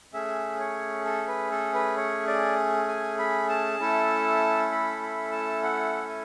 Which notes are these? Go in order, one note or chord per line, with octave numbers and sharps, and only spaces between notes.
A3 C#4 G#4 E5
C#5
A4
B4
A4
B4
C#5
D5
G#5
B5
A5
A3 C#4 E4 A4
B5
B5
A5
F#5
G#5